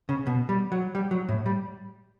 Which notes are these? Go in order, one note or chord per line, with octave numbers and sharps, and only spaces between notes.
C#3
B2
G3
F#3
G3
F#3
A2
G3